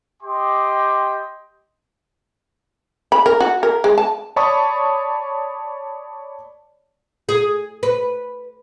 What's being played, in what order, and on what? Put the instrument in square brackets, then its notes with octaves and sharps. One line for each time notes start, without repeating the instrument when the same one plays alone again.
[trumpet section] G4 D#5 G5 C6 D6
[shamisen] B5
A#4
F#4
A#4
G#3
A5
[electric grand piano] C#5 D5 A5 B5 C#6 D#6
[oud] G#4
B4